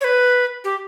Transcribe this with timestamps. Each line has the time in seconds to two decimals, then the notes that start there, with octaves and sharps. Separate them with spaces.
0.01 C#5
0.04 B4
0.64 G4